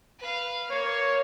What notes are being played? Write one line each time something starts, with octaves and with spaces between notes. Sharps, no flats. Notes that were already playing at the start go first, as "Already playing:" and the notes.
B4 F5
A#3 C#5